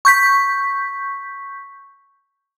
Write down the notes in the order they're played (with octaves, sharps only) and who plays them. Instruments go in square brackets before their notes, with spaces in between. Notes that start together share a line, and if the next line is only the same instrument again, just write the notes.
[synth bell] C#6 G6 B6